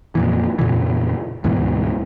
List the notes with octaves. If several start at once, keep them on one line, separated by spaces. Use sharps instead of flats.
F2 A#2 E3
F2 A#2 C#3 E3
D2 G#2 B2 E3